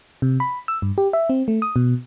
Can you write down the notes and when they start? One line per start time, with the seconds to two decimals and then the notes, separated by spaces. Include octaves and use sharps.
0.22 C3
0.40 B5
0.68 E6
0.82 G2
0.98 G4
1.13 E5
1.29 C4
1.48 A3
1.62 D#6
1.76 B2